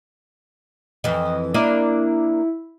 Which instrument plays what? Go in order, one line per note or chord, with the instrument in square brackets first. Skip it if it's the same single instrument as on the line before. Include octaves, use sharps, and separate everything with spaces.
[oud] F2 E3 [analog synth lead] D#5
[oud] A#3 D4 D#5 [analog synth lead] E4